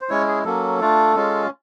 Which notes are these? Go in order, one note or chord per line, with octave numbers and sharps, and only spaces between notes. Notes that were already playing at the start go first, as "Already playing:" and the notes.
C5
G#3 C#4 E4 C#5
G#4
F#3 A#3 C#4 A4
A3 D4 F4
G#3 C#4 F4